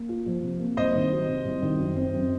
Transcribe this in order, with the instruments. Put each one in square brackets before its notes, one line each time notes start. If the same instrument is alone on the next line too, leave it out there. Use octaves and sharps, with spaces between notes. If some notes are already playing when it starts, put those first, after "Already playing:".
Already playing: [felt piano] A#3
F4
F3
C3
A#3
[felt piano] C2 [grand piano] C5 D#5
[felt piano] D#3
F#3
C3
C2
D#3
F#2
C4
F#2